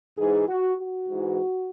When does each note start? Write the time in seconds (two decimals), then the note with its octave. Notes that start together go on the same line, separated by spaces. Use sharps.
0.18 G#2 E3 G#4
0.48 F#4
0.78 F#4
1.08 G#2 E3